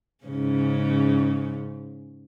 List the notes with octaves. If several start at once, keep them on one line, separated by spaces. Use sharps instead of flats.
G#2 C#3 C#4